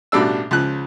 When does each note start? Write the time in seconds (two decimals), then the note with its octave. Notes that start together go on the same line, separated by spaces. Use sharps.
0.12 A1 B2 G3 D4 E6
0.51 C#2 F3 F#6